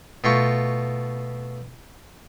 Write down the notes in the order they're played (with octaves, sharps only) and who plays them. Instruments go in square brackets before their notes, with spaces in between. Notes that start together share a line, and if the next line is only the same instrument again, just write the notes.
[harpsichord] B2 A3 F4 G5 C#6